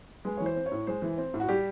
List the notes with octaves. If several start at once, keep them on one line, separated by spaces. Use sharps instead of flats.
G#3 B4
C#5
E3
C5
C4
C#5
A2
G#3 C5
E3
C4
A2
F#4
G3 G4